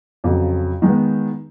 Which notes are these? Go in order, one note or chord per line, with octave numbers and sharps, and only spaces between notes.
F2 C#3 F#3
D#3 G#3 B3